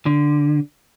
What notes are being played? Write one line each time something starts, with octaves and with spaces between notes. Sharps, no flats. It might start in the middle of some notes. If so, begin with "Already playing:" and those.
D3